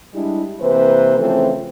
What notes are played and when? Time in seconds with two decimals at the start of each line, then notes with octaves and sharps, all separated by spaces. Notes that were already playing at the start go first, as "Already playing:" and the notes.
0.14 G3 G#3 D4 E4
0.61 C3 E3 A#3 B4 C5
1.18 C#3 E3 F3 A3 C4